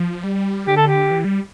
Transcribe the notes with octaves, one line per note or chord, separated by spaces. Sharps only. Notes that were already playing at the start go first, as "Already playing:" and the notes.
Already playing: F3
G3
D3 G4
A4
G4
E3
G3